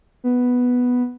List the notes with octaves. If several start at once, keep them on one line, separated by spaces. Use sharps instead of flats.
B3